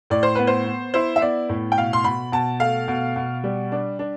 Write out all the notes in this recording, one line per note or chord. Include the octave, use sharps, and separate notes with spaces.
A2 D5
C5
B3 B4
C5
B3
E4 C5
E5
B3 D5
A2
G5
B2 F5
C6
B2 B5
B2 A5
A3 F5
B2
B2
G3
D4
D4